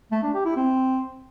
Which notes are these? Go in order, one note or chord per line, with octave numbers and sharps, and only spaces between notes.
A3
D4
G4
E4
C4